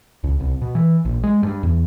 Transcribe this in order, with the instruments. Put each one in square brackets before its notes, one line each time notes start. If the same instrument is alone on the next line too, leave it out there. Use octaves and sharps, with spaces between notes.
[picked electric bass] C#2
C2
B2
E3
A#1
G#3
G2
E2